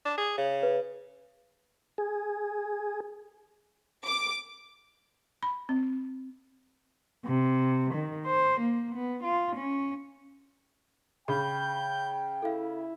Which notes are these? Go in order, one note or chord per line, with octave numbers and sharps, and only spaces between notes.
D4
G#4
C#3
B4
G#4
D6
B5
C4
C3
D#3
C5
A#3
B3
F4
C#4
C#3 G#4 G5 B5 G6
E4 A4 F5